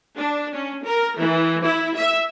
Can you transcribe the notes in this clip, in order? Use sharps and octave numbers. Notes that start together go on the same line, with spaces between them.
D4
C#4
A#4
E3
E4
E5